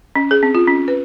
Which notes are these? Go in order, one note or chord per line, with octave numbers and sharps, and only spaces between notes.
C#4
G#4
C4
F4
C#4
B4